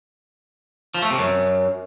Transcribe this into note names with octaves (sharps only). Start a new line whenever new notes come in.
F3
A3
C3
F#2